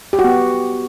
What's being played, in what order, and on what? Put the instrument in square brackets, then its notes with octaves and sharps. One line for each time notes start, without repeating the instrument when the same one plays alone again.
[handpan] G4
F#4
B3